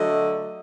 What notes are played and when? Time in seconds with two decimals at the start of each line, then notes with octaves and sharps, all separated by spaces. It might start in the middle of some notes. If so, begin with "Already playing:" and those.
Already playing: D3 F#3 A3 D#5